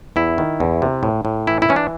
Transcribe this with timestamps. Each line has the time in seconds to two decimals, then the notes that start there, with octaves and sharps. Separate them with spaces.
0.16 E2 E4
0.38 D#3
0.60 E2
0.82 C3
1.03 A2
1.25 A2
1.47 E3 E4
1.62 E4
1.69 E3 C#4
1.76 D4